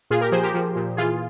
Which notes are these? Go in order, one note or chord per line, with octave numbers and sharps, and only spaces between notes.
A#2 F4 G#4
G4 A#4
F3 G#4 C5
G4 A#4
F3
A#2
E3 F4 G#4